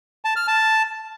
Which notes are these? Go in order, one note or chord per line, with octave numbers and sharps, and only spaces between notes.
A5
F6
A5